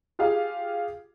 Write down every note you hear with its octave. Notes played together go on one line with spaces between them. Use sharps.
F4 G4 G#4 F5